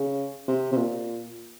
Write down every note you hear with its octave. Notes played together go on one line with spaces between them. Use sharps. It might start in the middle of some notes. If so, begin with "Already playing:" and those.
Already playing: C#3
C3
C3
A#2